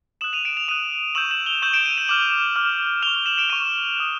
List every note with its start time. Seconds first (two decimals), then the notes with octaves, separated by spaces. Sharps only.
0.21 D#6 F#6 E7 F#7
0.33 D#7 F7
0.45 D7 E7
0.57 D#7 F7
0.68 D#6 F#6 D#7 F7
1.15 C#6 E6 G6 E7 F#7
1.31 E7 F#7
1.46 F7 G7
1.62 C#6 E6 G6 E7 F#7
1.74 D7 E7
1.86 D#7 F7
1.97 E7 F#7
2.08 D6 F6 E7 F#7
2.56 D6 F6
3.02 F6 F7 G7
3.07 C#6
3.14 F7 G7
3.26 E7 F#7
3.38 D7 E7
3.50 C#6 F6 D#7 F7
3.97 D#6 F#6